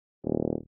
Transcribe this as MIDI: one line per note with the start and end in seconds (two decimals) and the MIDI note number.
0.24 0.54 27